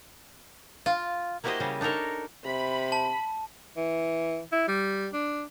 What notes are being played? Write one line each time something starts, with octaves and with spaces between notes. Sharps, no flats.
F4
A#3 E4 F#4 G4 C5 D#5
C#3 G3
D4 D#4 A4 A#4 C#5
C3 B5
A5
E3
E4
G3
D4